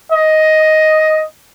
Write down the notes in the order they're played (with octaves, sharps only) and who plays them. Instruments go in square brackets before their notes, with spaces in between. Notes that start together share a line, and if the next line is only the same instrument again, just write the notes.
[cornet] D#5